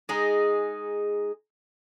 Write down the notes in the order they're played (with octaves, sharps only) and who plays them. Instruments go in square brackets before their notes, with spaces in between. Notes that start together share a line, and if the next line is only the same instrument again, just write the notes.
[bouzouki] G#3 D#4 G#4